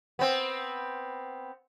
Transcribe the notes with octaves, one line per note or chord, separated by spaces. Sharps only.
B3 C4